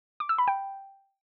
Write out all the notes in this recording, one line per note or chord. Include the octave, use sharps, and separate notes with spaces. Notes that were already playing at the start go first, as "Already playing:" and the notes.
D6
E6
B5
G5